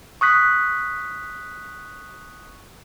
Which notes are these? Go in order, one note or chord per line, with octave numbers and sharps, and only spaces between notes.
C#6 D#6 F#6 B6